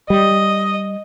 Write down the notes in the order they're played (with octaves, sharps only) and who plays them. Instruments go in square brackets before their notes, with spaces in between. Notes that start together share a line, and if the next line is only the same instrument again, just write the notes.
[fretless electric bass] G3 [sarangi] D#5